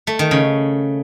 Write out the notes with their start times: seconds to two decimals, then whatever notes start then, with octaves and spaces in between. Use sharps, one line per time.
0.07 A3
0.19 D#3
0.31 C#3